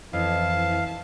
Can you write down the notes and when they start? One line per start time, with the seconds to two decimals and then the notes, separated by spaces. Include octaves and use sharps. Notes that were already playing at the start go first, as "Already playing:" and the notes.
0.13 F2 E3 E4 F5 A5